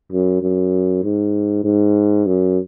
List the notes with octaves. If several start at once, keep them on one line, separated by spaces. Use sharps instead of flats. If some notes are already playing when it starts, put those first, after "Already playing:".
F#2
F#2
G#2
G#2
F#2